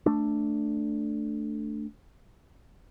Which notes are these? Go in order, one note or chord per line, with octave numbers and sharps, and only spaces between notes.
A3 D4